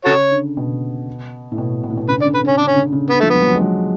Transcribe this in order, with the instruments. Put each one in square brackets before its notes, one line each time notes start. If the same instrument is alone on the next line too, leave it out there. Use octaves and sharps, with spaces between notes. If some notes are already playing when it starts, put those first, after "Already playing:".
[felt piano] C#3 [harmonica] F#4 A4 C#5
[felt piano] D3
B2
A2
B2
B2
A2
B2
[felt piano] C#3 [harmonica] B4
[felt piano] D3
[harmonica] D5
[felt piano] C#3
[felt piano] D3 [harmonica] B4
[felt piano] C#3
[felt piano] D3 [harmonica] C#4
[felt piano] C#3 [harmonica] D4
[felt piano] D3 [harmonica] C#4
[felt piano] C#3
D3
C#3
[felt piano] D3 [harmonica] B3
[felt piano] F3 [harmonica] A3
[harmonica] B3
[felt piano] F3
F#3
F3
G#3
F#3